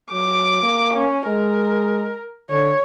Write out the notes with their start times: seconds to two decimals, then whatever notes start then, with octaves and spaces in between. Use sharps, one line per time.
0.12 F#3 D6
0.63 A#3
0.94 C#4
1.27 G#3 A#4
2.50 D3 C#5